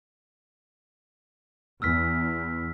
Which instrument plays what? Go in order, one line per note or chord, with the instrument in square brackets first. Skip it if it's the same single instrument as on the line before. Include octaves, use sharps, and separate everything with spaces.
[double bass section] E2 [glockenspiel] E6 F6 B6